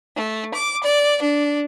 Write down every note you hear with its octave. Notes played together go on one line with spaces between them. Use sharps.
A3
D6
D5
D4